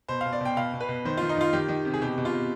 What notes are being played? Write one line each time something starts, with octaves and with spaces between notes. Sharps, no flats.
B2 C5
B2 F5
D5
B2 G5
B2 F5
B2
B4
B2
D#3 C5
D#3 F4
D#4
D#3 F4
D#3 G4
D#3
C3
G#4
B2 G4
B2
F4
B2